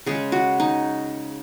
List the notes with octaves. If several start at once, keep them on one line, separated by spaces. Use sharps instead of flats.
C#3 G#3 G#4
F#4
D#4